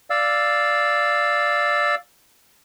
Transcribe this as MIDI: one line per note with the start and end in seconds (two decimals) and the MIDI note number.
0.10 1.95 74
0.10 1.95 77
0.10 1.95 88